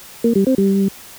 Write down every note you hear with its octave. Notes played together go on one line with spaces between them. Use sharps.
A#3
G3
C4
G3